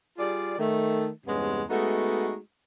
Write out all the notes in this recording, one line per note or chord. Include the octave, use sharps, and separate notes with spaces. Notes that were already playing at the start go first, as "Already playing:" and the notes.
G3 F4 G#4 D5
D#3 A3
E2 G2 C3 G#3 B3 C#4
G#3 A3 B3 D#4 F#4